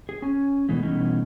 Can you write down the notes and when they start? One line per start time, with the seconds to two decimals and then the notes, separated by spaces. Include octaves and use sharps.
0.09 G#4
0.22 C#4 G#5
0.69 B2 E3 G#3 A3
0.83 B2 E3 G3 A3 C#4 D#4